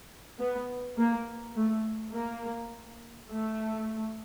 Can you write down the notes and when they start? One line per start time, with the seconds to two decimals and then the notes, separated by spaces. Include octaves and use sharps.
0.39 B3
0.97 A#3
1.56 A3
2.13 A#3
3.29 A3